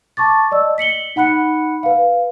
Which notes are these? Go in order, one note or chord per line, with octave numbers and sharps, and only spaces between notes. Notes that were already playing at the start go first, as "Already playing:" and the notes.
A5 C#6 D6 A6
D5 D#5 E6
B6 C#7 F#7 G7
D#4 F#5 B5 F#6 C#7
B4 F5